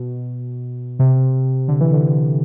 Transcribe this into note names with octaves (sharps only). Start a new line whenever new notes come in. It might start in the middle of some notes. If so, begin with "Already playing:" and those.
Already playing: B2
C3
D3
E3
D3